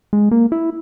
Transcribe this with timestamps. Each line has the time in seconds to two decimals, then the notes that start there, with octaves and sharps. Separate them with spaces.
0.13 G#3
0.31 A#3
0.52 E4